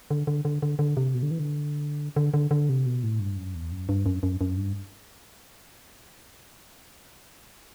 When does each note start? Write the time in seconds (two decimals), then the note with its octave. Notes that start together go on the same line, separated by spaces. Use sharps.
0.11 D3
0.27 D3
0.45 D3
0.62 D3
0.79 D3
0.97 C3
1.14 B2
1.23 D3
1.31 E3
1.39 D3
2.16 D3
2.34 D3
2.51 D3
2.69 C3
2.86 B2
3.03 A2
3.20 G2
3.37 F#2
3.55 E2
3.72 F#2
3.89 G2
4.06 F#2
4.23 F#2
4.41 F#2
4.57 G2